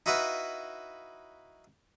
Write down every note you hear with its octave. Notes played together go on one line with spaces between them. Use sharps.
D#4 E4 F#4 B4 E5 F5